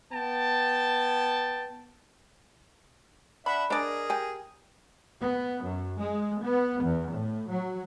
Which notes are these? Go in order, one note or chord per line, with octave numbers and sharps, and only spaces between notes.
B3 G5 A5
D4 E5 F#5 B5
D4 G#4 A#4 D5 D#5 A#5
G4 G#5
B3
F#2
G#3
B3
E2
A2
F#3